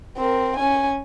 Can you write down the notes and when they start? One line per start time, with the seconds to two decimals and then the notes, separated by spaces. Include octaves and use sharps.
0.17 C4 A#4
0.57 C#4 G#5